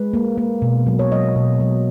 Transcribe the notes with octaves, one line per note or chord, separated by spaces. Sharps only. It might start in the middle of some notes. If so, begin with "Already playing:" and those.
Already playing: G#3 B4
A#3
A#3
B2
F#3
C#5
F#3 D#5
B2
F#3